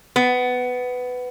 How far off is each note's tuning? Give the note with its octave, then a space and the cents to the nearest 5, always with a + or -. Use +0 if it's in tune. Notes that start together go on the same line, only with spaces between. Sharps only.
B3 +15